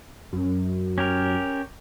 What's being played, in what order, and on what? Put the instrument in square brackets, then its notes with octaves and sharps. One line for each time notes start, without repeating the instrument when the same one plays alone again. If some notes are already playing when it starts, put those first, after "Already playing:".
[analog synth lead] F#2
[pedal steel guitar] C#4 G4 A#4